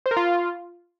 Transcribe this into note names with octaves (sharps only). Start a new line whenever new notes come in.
C5
A#4
F4